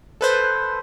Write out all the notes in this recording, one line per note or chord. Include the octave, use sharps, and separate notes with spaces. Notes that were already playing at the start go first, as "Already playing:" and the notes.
A4 B4 C5